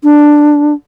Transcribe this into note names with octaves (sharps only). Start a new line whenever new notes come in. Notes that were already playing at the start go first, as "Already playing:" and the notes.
D4